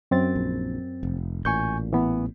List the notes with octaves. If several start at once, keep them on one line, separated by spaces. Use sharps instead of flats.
F#2 C4 A6
A#1
F1
A1 A#2 G#5 C#6 G6
E3 B3